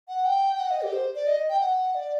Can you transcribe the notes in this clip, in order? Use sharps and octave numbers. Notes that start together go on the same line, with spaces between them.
F#5
G5
F#5
D#5
G4
C5
D5
D#5
G5
F#5
D5